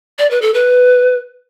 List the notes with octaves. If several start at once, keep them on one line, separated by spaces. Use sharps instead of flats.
D5
B4
A4
B4